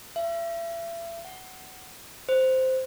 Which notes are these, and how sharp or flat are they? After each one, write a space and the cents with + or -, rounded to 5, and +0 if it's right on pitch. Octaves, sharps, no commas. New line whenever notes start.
E5 +35
F#5 +20
C5 -5